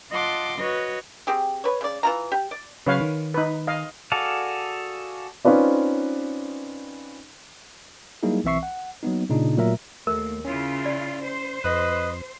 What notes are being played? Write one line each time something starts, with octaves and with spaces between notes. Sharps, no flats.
F4 D#5 F#5 A5 C6 D6
F#4 B4 C#5 D#5
C4 G4 G#4
B4 C#5
C#3 D5
E3 F4 A#5
G4
D5
C#3 F#3 B4 C#5 F5
D#3
D#4 B4
D#5 F5
F#4 G#4 A4 D5 F5
C4 C#4 D#4 F4 B4 D5
F#3 G3 A#3 D#4 E4 G#4
B1 E3 C4 E5 C#6 C7
F#5
F#3 A#3 B3 D#4
A#2 C#3 D4 D#4
A#2 F#3 A3 A#4 E5 A#5
D#2 A3 A#4
C#3 C#4 E4 F4
D5
C5
F2 B4 D#5